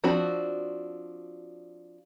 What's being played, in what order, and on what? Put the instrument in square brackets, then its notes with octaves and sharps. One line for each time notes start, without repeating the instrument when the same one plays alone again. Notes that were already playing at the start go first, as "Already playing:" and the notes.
[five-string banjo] F3 C4 D4 F#4 B5